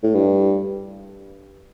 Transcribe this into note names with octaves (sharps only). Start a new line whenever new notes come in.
A2
G2